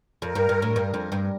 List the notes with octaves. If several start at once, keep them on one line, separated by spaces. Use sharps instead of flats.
F2 A#4
G2
G2
A2
G2
F2
G2